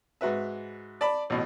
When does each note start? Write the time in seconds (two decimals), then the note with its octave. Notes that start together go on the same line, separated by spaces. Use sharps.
0.21 G#2 F#4 B4 E5
1.01 D5 A5 B5
1.30 A1 B2